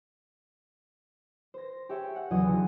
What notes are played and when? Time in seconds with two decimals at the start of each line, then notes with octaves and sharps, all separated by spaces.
1.54 C5 A#6
1.89 G4 G#4 C#5 E5 G5
2.14 F#5 C#7
2.31 E2 C#3 F#3 D#5 D#6
2.44 D3